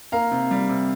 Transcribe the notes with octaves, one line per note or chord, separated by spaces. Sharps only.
A#3 F5 A#5
C3
G3
C3